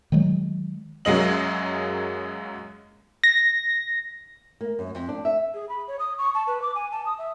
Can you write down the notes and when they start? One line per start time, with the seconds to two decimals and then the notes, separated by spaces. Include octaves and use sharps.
0.12 D#3 F#3 G#3
1.05 F#2 F#3 G#3 A#3 D#5 F#7
3.24 A#6
4.61 A#3
4.79 F#2
4.95 F2
5.09 D4
5.25 E5
5.54 G#4
5.69 B5
5.88 C#5
5.99 D#6
6.18 C#6
6.35 A5
6.47 B4
6.62 D6
6.75 G#5
6.92 A5
7.06 D#6
7.18 E5